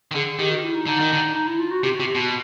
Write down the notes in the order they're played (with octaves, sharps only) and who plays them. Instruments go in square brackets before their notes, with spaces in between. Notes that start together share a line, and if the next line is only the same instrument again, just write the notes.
[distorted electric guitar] D#3
[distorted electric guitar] D3 [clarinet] G#4
[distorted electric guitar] D#3 [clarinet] G4
[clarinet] F#4
E4
D#4
[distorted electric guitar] D3 [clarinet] D#4
[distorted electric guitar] D#3
D3
[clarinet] D#4
E4
F4
F#4
[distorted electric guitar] C3 [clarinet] G4
[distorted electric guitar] C3 [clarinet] F#4
[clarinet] G4
[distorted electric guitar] B2 [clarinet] F#4